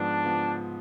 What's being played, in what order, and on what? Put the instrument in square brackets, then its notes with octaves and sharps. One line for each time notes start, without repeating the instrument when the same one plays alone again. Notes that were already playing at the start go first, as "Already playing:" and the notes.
Already playing: [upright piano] G#2 F3 B3 [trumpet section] D4
[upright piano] F3 B3